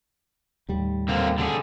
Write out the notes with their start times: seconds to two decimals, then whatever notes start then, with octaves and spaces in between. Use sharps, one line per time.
0.69 D#2 A2 G3
1.08 D3 A#3 C4
1.38 D3 G4 G#4